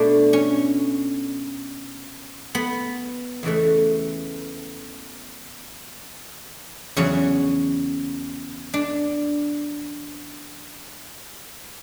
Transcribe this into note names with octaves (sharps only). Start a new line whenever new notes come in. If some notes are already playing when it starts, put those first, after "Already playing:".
Already playing: B2 A3 D4
C#4
B3
E2 C#3 E3 A3
E2 C#3 F#3 C#4
D4